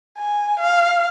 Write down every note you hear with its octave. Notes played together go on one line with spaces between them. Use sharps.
G#5
F5